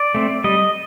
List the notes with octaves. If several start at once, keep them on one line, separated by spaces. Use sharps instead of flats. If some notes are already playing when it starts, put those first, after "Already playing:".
Already playing: D5
A3 C4
G3 D#5